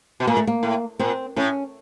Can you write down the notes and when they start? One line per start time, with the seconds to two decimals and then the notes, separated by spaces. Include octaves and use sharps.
0.20 B2
0.27 A#2 A#3
0.37 A3
0.47 A#3
0.63 A2
0.99 A#2 C4
1.36 A2 C#4